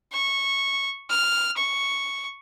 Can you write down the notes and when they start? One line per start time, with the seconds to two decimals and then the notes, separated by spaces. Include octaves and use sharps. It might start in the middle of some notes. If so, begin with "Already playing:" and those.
0.12 C#6
1.10 F6
1.57 C#6